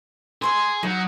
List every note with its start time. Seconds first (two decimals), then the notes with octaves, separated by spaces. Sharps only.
0.42 G#4 C6 C#6 E6
0.83 F#3 D#4